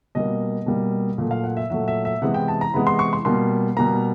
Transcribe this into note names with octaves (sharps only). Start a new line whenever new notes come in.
B2 G3 A#3 D#5
B2 G3 A#3
A#2 F#3 A3
F5
F#5
E5
A#2 F#3 A3 E5
E5
E5
C3 E3 G#3 B3 F#5
G5
A5
A#5
C3 E3 G#3 B3 B5
C6
C#6
C6
B2 G3 A#3 C6
B2 G3 A#3 A#5